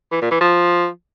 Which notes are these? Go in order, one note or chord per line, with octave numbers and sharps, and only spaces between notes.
E3
A#2
E3
F3